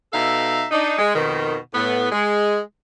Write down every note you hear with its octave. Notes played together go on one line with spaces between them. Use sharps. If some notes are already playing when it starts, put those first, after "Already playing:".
B2 D#4 A4 E5 F5
D4 D#4
G#3
F2 B2 D#3
A2 B3
G#3